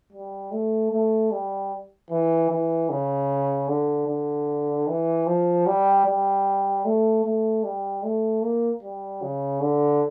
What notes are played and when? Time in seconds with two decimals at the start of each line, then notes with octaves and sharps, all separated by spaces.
0.12 G3
0.51 A3
0.92 A3
1.31 G3
2.10 E3
2.50 E3
2.89 C#3
3.68 D3
4.08 D3
4.87 E3
5.26 F3
5.66 G3
6.06 G3
6.85 A3
7.24 A3
7.63 G3
8.03 A3
8.42 A#3
8.82 G3
9.22 C#3
9.61 D3